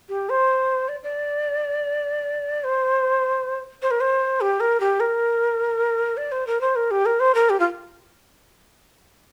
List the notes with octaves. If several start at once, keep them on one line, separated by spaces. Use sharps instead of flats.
G4
C5
D5
D5
C5
C5
A#4
C5
G4
A#4
G4
A#4
D5
C5
A#4
C5
A#4
G4
A#4
C5
A#4
G4
F4